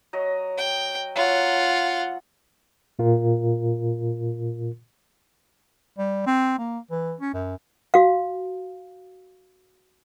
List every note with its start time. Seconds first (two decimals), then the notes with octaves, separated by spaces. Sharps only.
0.13 F#3 D#5
0.58 G5
1.16 F#3 F4 F#5
2.99 A#2 F4 A#4
5.99 G3
6.27 C4
6.59 A#3
6.91 E3
7.20 C#4
7.34 F#2
7.94 F#4 F5